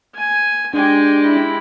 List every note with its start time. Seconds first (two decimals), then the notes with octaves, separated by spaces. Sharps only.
0.15 G#5
0.73 G#3 D4 G4 G#5
1.24 E4